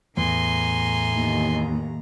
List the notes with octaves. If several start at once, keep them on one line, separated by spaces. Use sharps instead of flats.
E2 A2 G#5 A#5 C6
D#2